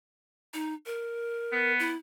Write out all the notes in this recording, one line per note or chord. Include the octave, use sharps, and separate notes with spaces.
D#4
A#4
B3
E4